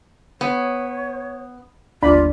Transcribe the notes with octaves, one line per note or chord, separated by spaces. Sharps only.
B3 C#5
G1 D#2 D4 F4 D5 B5